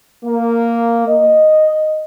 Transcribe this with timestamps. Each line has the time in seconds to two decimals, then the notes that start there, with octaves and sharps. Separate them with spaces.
0.24 A#3
1.08 D#5